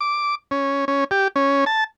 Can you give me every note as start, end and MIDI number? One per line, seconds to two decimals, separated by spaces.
0.01 0.35 86
0.51 0.85 61
0.88 1.04 61
1.11 1.28 67
1.36 1.65 61
1.66 1.84 81